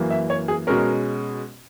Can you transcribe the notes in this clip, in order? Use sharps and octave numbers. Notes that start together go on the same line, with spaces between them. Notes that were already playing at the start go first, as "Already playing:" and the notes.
Already playing: F#2 E3 A#3
E5
C#5
G#4
B2 G#3 C#4 A#4